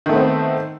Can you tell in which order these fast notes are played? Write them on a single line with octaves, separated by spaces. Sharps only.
D#3 A3 B3 C4